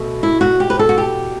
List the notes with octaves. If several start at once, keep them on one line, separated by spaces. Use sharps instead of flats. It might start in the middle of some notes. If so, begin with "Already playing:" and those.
Already playing: B2 A3
E4
F#4
G4
B4
A4
F#4
G4